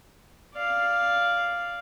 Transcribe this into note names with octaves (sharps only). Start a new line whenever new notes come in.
D5 F5